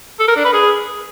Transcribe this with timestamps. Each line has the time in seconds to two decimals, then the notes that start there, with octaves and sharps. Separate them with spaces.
0.19 A4
0.28 A#4
0.36 D4
0.44 B4
0.53 G#4